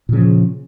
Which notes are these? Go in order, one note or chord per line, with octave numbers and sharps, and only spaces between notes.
A#2 C#3 F3